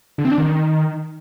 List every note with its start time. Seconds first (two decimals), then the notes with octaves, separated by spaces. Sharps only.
0.18 D3
0.25 C4
0.31 D4
0.38 D#3